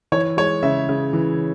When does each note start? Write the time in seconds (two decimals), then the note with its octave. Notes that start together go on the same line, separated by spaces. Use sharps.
0.12 E3 C#5
0.37 G#3 C#5
0.63 C#3 E5
0.89 C#3
1.13 E3